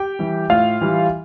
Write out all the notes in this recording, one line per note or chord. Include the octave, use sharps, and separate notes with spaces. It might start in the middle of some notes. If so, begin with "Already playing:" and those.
Already playing: G4 G5
E3 G3
A2 F4 F5
E3 G3